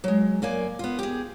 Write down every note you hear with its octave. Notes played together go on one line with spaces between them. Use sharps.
F#3 G#3
F#2 A#3 D5 G#5
B3 F4
G4 G#4